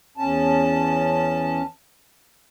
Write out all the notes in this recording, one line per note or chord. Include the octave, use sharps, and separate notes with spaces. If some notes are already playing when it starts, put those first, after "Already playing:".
E2 C#4 A5